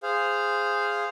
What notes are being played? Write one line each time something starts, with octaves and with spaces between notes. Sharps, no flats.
G#4 C5 F5